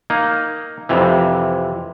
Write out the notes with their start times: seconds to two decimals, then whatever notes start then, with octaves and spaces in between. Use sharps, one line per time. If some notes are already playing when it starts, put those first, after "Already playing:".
0.10 A#3 D#4
0.89 F2 C3 E3